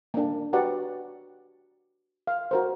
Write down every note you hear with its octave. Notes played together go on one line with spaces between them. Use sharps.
A#3 D4
F#4 G4 B4 D5 F#5
F5
F#4 A#4 C5